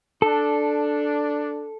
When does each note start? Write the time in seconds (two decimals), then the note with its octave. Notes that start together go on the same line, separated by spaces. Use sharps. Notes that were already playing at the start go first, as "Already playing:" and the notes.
0.22 D4 A4